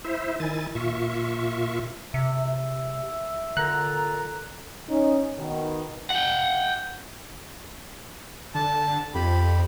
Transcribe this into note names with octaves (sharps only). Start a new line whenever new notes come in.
E4 C5 E5
D#3 E4 G#5 A6
A#2 F4 E5 C#6
C3 E5
A#2 D3 A4 A#5 F#6
C#4 D#4
B2 D#3
F#5 G5
D3 A5
F2 G4 B5